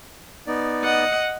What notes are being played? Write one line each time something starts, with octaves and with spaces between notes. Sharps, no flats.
B3 D#4 D5
D#5 F#5